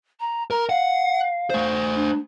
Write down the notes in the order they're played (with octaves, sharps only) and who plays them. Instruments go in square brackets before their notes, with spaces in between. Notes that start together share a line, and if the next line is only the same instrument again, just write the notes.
[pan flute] A#5
[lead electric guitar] A#4 [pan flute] A#5
[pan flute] F5 [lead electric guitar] F#5
[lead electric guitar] A3 C5
[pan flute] D4